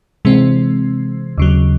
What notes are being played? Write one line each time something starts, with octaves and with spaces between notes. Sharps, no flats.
C3 E3 G#3 C4
D#2 C#3 F#3